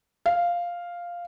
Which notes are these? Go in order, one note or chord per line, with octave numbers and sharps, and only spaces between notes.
F5